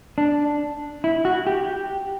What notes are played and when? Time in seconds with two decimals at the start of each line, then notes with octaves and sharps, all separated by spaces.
0.18 D4
1.04 E4
1.25 F#4
1.47 G4